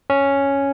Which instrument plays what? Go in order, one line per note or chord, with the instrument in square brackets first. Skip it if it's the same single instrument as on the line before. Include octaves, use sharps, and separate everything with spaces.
[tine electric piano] C#4